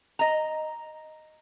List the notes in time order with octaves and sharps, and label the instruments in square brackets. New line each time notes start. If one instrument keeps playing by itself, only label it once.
[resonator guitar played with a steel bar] D#5 A#5